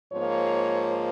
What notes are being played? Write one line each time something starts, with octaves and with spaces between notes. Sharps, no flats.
G#2 F3 A#3 C#5